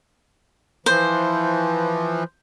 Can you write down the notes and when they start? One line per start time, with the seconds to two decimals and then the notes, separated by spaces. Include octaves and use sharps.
0.86 E3 F3 C5